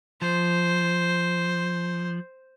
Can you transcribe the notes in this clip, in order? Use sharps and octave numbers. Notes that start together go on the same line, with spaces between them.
F3 C5